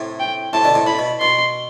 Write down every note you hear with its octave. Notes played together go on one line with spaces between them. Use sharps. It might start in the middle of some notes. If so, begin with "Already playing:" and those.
Already playing: A2 C3
G5
A2 C3 A5
B2 D3
A2 C3
A2 B5
B2
B2 C6